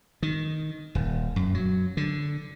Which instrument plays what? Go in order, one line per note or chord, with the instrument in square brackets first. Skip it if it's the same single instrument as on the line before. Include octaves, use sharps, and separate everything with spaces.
[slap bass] D#3
D#1
F#2
F#3
D3